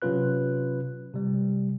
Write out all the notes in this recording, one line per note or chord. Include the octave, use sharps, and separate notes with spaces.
C3 F#3 C#4 F4 B4 F#6
C3 G3